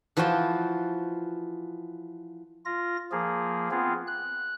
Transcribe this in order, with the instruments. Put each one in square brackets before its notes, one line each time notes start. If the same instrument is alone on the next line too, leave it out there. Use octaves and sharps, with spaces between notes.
[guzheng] E3 F3 F4 F#4 G5 A5
[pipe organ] F4 A#6
F3 A#3 G#4
B3 C4 F4 G#4
F#6